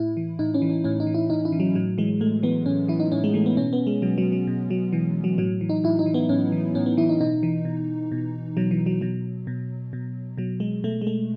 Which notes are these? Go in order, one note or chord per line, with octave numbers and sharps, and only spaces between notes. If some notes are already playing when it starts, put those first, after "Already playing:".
Already playing: A2 E4
E3
A2 D#4
C#4
E3
C#4
A2 C#4
D#4
E3
E4
A2 D#4
E4
E3
F#3
A2 F#3
E3 G#3
A2 A3
E3 B3
A2 C#4
E3 E4
D#4
A2 C#4
G#3
E3 A3
B3
B2 C#4
B3
G#3
B2 F#3
F#3
F#3
B2
F#3
B2 E3
F#3
A2 F#3
E3
D#4
A2 E4
D#4
E3
B3
A2 C#4
E3
A2 C#4
B3
E3 E4
D#4
B2 D#4
E3
B2
B2
B2 F#3
E3
F#3
B2 F#3
B2
B2
B2 F#3
G#3
B2 A3
G#3
A3